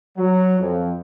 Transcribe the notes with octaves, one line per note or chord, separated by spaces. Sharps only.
F#3
F2